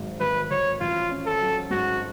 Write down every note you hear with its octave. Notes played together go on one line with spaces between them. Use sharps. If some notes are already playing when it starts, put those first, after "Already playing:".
Already playing: G#1 G#2 F#3
G#1 B4
G#1 C#5
A1 F4
C#4
A4
F#3
G#2 F#4